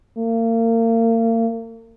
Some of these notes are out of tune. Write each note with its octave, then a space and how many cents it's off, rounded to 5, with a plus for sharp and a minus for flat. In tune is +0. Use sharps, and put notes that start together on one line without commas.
A#3 -35